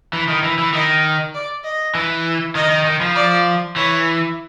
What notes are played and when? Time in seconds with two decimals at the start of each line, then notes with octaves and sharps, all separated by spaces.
0.13 E3
0.28 D#3
0.43 E3
0.58 E3
0.73 D#3 D#5
1.34 D5
1.64 D#5
1.95 E3
2.55 D#3 D#5
2.70 D#3
2.85 D#3
3.01 F3
3.16 D5
3.76 E3 C#5